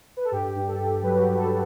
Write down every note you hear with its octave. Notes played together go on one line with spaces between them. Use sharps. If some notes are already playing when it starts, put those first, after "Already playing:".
B4
A4
G2 G4
G2
A4
G2
F#3 B4
F#4
G4
G2
A4